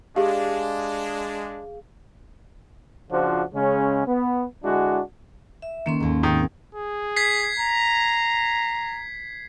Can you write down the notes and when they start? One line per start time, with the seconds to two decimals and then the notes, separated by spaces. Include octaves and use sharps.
0.16 G#3 D4 G4 G#4 F5
3.11 C#3 F3 D4 F4 F#4 C5
3.54 C#3 G#3 C#4
4.06 B3
4.64 D3 G#3 D4 E4 F#4
5.62 E5
5.86 D#3 A#3 C#4 C6
6.00 D#2 G#2
6.23 G#2 D#3 C4
6.75 G#4
7.16 G#6 B6 C7
7.60 A#5